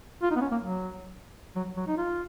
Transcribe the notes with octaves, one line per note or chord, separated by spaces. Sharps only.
F4
D#4
B3
C#4
A#3
F#3
F#3
F#3
D#4
F4